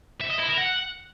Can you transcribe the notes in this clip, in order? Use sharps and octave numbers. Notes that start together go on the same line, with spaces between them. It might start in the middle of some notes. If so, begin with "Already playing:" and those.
E5
D#5
E4
A#4
F#5